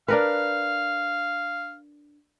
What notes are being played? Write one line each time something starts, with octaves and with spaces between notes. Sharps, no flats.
D4 A#4 B4 F5